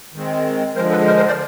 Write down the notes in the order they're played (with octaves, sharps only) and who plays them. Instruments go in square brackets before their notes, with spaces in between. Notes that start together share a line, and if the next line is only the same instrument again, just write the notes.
[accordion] D#3 G#3 C4
D3 F3 G#3 A#4 C5
A4 B4
A#4 C5
A#4 C5
C5 D5